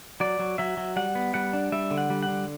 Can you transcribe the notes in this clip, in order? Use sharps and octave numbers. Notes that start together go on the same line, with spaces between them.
F#3 D5
F#3
F#3 E5
F#3
G3 F#5
B3
G3 F#5
D4
G3 E5
D3
F#5
G3
F#5
D3